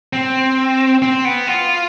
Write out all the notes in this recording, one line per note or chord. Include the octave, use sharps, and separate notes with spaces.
C4
C4
B3
F4